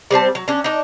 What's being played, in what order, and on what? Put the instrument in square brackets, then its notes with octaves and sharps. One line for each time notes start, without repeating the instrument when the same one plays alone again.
[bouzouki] G3 C4 C5 A5
F#3
C#4 D4
D4 D#4